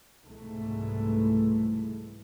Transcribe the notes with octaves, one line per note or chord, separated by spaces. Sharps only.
C2 G#2 B2 E3 A3